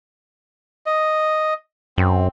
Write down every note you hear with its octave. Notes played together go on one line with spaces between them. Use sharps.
D#5
F#2 C4